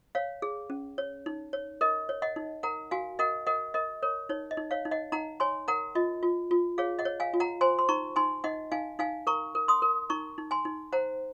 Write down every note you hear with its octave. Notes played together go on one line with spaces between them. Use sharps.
C#5 F5
G#4
C#4
C#5
D#4
C#5
A#4 D#5
C#5
D#5 F#5
D#4
A#4 F#5 A#5
F#4 F5 G#5
A#4 D#5 F#5
A#4 D#5 F#5
A#4 D#5
A#4 C#5
D#4 C#5
D#5
D#4
C#5 F5
D#4
D#5 F#5
D#4 F#5 A#5
C#5 G#5 C6
A#4 F#5 A#5
F4 D#5
F4
F4
G#4 C#5 F5
D#5 F#5
C#5
F5 G#5
F4
F#5 A#5
C5 G#5 C6
C6
D#4 A#5 C#6
D#4 G#5 C6
D#4 D#5 F#5
D#4 F5 G#5
D#4 F5 G#5
A#4 A#5 C#6
A#4
C6 D#6
A#4
D#4 A#5 C#6
D#4
G#5 C6
D#4
C5 F#5 A#5